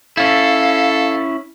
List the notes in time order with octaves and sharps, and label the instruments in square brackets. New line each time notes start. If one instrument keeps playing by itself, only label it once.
[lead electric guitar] C#4 E4 [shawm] A4 [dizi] F5